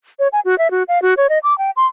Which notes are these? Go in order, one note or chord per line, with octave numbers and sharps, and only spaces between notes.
C#5
G#5
F#4
E5
F#4
F5
F#4
C#5
D#5
D6
G5
C6